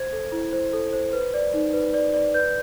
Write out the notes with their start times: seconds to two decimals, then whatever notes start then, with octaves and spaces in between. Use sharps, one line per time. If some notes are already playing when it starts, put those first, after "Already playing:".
Already playing: C5 G#6
0.12 A4
0.32 E4
0.53 C5
0.73 A4
0.93 C5
1.13 B4
1.34 D5
1.54 D#4
1.73 B4
1.94 D5
2.14 D5
2.34 B4 G6